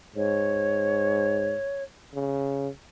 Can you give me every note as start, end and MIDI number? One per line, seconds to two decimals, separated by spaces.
0.16 1.56 44
0.16 1.82 73
2.15 2.68 49